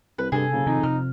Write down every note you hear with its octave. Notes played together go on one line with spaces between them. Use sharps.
C2 B4
G2 C3 G#4 A4
F#1 C#3
F2 C3 D#3 D#4
C3 F6